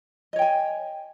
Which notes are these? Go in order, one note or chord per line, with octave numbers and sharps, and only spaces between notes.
C#5 D#5 G5 G#5